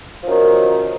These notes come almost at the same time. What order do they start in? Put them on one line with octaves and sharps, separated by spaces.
F3 F#2 D#3